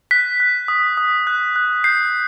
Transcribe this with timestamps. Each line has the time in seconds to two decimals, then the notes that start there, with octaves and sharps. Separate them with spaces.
0.11 F#6 B6
0.40 F#6
0.68 D#6
0.97 D#6
1.27 F#6
1.56 F#6
1.84 G6 C7